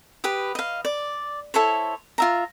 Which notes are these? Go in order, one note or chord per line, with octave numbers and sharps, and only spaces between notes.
G4 B4 D#6
D#5 F5
D5
E4 A4 C5 C#5
F4 E5 A#5